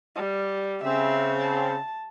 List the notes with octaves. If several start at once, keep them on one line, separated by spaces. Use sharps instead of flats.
G3
C#3 C4 E5
A5